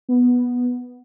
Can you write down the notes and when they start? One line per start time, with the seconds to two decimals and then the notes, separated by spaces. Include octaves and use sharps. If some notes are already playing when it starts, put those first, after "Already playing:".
0.09 B3